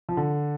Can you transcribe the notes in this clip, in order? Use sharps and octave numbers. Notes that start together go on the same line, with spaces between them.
F3
D3